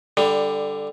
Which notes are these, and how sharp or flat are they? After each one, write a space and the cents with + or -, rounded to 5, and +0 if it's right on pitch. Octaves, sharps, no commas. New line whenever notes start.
D3 +0 G3 +10